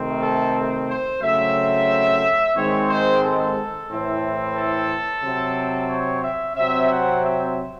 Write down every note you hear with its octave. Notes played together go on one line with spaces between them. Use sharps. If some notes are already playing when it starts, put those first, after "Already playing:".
Already playing: C3 D#3 A3 C4
A4
C5
C#3 F#3 A3 C4 E5
G#2 D#3 G#3 C4 C#5
C5
A4
A2 E3 C4
A4
C3 F#3 C4
C#5
E5
C3 F#3 C4 E5
F#5
E5